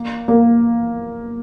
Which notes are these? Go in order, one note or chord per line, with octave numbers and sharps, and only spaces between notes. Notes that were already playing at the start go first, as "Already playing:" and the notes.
Already playing: A#3
A#3